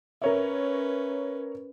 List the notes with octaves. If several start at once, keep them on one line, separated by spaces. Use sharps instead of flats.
C#4 A#4 B4 C#5 E5